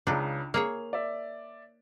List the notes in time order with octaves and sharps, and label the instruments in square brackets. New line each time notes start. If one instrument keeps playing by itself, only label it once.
[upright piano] C#2 C#3 [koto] D4 D#4
[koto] A#3 G#4 C#5 [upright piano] F7
[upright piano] D5 E5